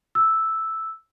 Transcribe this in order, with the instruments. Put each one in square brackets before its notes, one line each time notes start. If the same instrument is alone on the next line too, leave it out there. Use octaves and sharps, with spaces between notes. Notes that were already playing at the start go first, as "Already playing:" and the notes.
[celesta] E6